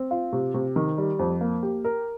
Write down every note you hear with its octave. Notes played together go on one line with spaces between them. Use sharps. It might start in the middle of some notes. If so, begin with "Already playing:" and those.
Already playing: C4
F4
C3
C3
D#3
G3
F2
A#3
G4
A#4